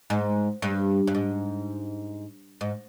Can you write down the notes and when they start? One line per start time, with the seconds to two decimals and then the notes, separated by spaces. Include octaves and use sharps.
0.10 G#2
0.62 G2
1.07 G2
1.15 G#2
2.61 G#2